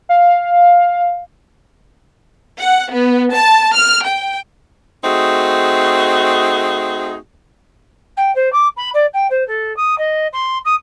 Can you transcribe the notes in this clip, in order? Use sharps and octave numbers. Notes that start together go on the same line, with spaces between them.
F5
F#5
B3
A5
F6
G5
A3 C4 D#4 F#4 G#4
G5
C5
D6
B5
D5
G5
C5
A4
D#6
D#5
C6
D#6